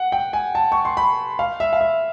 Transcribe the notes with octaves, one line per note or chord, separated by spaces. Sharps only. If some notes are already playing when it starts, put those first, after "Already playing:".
Already playing: F#5
G5
G#5
A5
C#6
C6
B5
F5
E5
F5
E5